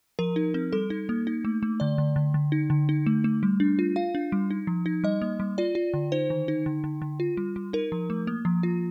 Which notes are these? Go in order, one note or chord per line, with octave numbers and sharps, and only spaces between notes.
F3 A#4
D#4
C4
G3 A4
D#4
A#3
D#4
A3
A3
D3 D5
D3
D3
D3
D#4
D3
D#4
A3
A3
G3
D4
F4
F4 F5
D4
G3
D#4
F3
D#4
G3 D#5
A#3
G3
F4 D5
F4
D3
D#4 C5
D#3
D#4
D3
D3
D3
F4
G3
G3
D#4 A#4
F3
A3
A#3
F3
F4